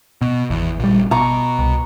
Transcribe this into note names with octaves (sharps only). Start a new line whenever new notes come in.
B2
G#1 E2
A#1 G3
B2 A#5 C#6 D6
C2